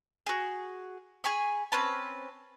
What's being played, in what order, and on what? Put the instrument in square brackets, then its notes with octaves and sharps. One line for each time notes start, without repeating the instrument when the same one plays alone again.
[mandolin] F#4 G#4
G#4 G#5 B5 C#6
C4 C#4 B4 A5